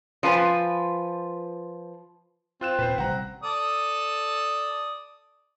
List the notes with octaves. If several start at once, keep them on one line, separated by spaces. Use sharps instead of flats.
F3 F4 B4 G#5
C4 F4 F#6 E7
D#1 A#2 B4 C5
A1 C3 G3 F#5 A#5
A4 D5 D#6